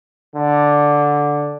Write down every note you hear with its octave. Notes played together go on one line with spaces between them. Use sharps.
D3